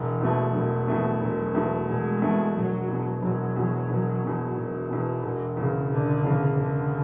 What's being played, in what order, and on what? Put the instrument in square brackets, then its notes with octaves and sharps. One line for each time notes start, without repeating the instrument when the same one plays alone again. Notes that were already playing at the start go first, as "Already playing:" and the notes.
Already playing: [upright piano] E1 [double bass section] E3
[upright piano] E2 B2 A3
[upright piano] E1 [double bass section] F#3
[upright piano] E2 B2 A3
E1
E2 B2 A3
[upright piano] E1 [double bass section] G#3
[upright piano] E2 B2 A3
[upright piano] E1 [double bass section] F#3
[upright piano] E2 B2
[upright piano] E1 [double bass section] F#3
[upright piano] E2 B2
E1
E2 B2
[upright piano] E1 [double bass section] E3
[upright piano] E2 B2
E1
E2 C#3
[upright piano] E1 [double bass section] D3
[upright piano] E2 C#3
[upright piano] E1 [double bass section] D3